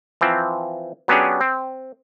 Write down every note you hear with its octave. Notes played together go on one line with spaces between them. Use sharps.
E3 F3 C4
F#3 B3 C#4 D4 G4 G#4
C4